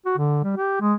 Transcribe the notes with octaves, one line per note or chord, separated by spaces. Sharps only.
F#4
D3
G3
G4
G#3